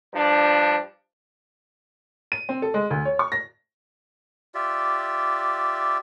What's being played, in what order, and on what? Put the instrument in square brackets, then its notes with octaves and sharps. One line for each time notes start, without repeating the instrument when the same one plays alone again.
[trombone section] G2 F3 D4
[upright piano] D#7
C4
A4
G#3
D2
C#5
C#6
A#6
[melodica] F4 G4 D5 E5